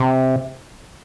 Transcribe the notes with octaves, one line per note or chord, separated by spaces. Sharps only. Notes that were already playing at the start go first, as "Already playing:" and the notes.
Already playing: C3